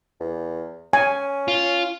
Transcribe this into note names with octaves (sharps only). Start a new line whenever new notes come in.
E2
C#4 G#5
F4